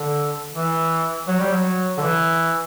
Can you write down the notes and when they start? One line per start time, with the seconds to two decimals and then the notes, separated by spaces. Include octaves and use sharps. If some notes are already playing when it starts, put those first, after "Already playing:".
Already playing: D3
0.54 E3
1.28 F#3
1.40 G3
1.52 F#3
1.98 D3
2.02 E3